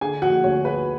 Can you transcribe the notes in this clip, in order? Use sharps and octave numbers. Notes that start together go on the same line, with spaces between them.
D3 G#4 G#5
F3 F#4 F#5
D2 C#5
G#3 B4